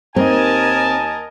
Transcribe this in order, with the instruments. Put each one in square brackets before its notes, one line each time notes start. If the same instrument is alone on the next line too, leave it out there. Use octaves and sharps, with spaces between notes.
[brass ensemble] D#2 G#5 A5 [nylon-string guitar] C4 [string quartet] A#4 D#5